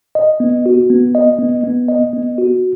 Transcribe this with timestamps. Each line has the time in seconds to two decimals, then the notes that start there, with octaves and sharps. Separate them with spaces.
0.15 D#5
0.40 B3
0.66 F#4
0.90 B3
1.15 D#5
1.38 B3
1.64 B3
1.88 D#5
2.13 B3
2.38 F#4